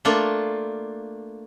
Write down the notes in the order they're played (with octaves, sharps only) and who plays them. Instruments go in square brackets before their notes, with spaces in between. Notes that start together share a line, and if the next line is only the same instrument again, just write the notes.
[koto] A3 A#3 D4 F4